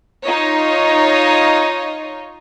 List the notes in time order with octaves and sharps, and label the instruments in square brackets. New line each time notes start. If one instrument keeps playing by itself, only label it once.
[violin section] D#4 F4 C#5 D#5